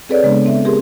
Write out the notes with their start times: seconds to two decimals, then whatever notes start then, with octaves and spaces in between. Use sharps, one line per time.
0.09 C4 G#4 A4 B4 C#5 D5
0.23 C#3 G#3 B3 D4
0.46 C4 E5
0.65 G4 G#4 A#4 C6